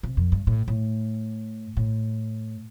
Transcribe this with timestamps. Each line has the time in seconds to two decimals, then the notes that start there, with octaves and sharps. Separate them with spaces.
0.03 C3
0.17 F2
0.32 G2
0.47 A2
0.68 A2
1.77 A2